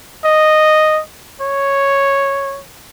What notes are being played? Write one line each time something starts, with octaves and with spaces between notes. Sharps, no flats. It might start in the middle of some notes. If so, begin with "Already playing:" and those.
D#5
C#5